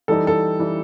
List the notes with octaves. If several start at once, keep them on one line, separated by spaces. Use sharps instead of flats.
E3 G3 D#4 A4
A4
E3 G3 D#4